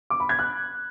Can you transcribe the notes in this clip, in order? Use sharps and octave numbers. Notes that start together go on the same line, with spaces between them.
D6
B5
G#6
F#6